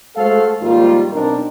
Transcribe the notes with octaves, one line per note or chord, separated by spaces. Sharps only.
G#3 A3 F#4 A4 C5 F5
G#2 D#3 F3 G3 A#3 F4
B2 F#3 C4 D4 D#4 A#4